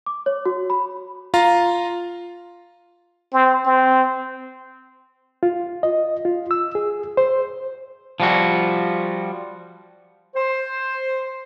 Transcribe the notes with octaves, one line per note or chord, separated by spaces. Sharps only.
D6
C#5
F#4
B5
F4 F5 A#5
C4
C4
F4
D#5
F4
E6
G#4
C5
F3 G3 F#4
C5